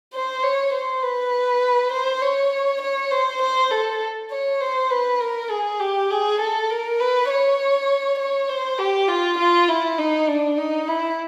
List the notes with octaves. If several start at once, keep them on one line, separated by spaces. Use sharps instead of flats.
C5
C#5
C5
B4
C5
C#5
C#5
C5
C5
A4
C#5
C5
B4
A#4
G#4
G4
G#4
A4
A#4
B4
C#5
C#5
C5
G4
F4
F4
E4
D#4
D4
D#4
E4